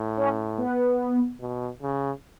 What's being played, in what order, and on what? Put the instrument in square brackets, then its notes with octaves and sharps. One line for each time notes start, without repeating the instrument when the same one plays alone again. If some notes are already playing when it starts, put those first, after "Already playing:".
Already playing: [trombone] A2
[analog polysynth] C#4
B3
[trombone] B2
C#3